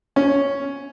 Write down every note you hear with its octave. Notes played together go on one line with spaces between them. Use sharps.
C#4